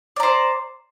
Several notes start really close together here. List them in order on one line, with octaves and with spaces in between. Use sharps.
D5 A#5 C5